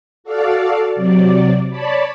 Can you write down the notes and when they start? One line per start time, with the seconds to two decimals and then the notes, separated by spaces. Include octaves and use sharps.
0.24 F#4 A4 D5 F5
0.96 C3 F#3 D5
1.70 C#5 D5 A5 B5